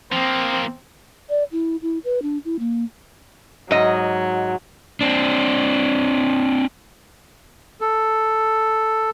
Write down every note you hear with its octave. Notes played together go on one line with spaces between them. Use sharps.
F3 A#3 C4
D5
E4
E4
B4
D4
E4
A#3
G#2 F#3 D#5
C4 D4
A4